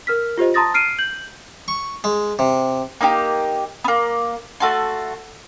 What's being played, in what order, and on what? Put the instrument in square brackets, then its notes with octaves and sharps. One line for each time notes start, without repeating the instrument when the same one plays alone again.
[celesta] A#4 F6 B6
F4 G4 C5 D#5
A5 A#5 C6 D#6 A6 A#6
F6 C7 D7 D#7
G6 F#7
[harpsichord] C#6
G#3
C3
[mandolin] A#3 D#4 E4 G4
A#3 B3
A3 F#4 A5 C6